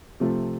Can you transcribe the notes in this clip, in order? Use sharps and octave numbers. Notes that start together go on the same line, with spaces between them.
C3 F3 A3 F4